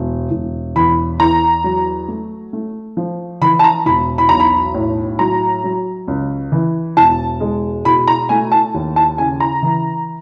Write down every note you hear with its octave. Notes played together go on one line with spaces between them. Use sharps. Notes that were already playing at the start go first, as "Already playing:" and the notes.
Already playing: E1
E1
E2 B5
E2 A#5
F#3
A3
A3
F3
E3 B5
A5
A#5
E1 B5
B5
B1 A#5
B5
A2
F#3 A#5
F#3
C#2
E3
E1 A5
G#3
B2 B5
A#5
A3 G#5
A5
D#2
A5
C#3 G#5
A#5
E3